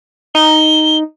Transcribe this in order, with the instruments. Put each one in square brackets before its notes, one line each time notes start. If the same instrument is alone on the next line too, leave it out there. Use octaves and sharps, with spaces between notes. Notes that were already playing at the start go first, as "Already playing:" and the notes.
[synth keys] D#4 [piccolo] G7